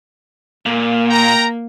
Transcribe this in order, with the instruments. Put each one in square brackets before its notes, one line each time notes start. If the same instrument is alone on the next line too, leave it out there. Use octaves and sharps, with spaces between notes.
[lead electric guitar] A#2 [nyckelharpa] A#3
[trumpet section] A#4 G5 A#5